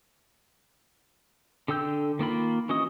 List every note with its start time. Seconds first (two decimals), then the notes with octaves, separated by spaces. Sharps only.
1.68 D3 A4 G5 E6 G6
2.19 D#3 A#3 F4 B5
2.69 E3 C#4 F#4 D#5 D#6